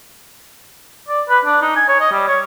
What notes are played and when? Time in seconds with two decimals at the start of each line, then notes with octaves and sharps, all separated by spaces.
1.08 D5
1.29 B4
1.45 D4
1.62 D#4
1.76 G#5
1.89 C#5
2.01 D#5
2.13 G3
2.28 C#5